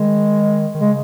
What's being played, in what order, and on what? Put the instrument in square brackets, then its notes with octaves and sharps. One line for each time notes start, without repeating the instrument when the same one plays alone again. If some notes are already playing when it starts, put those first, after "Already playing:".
Already playing: [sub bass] D#3 [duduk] G#3
[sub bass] D#3
[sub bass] C#3 [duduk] G#3